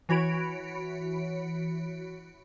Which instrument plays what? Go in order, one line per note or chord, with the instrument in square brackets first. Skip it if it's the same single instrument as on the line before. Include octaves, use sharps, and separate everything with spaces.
[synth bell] E3 F#4 C#5 B5 D7